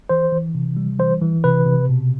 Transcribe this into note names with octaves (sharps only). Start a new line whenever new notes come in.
E3 C5
E3
C3
G3
E3 C5
E3
C3 B4
C3
B2